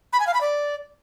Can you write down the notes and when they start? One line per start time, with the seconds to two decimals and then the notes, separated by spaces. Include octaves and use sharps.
0.13 B5
0.20 G#5
0.27 F5
0.34 B5
0.41 D5